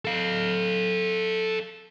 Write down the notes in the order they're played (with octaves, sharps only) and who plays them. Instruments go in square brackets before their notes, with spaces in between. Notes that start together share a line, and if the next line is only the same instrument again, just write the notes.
[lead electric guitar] A4 F5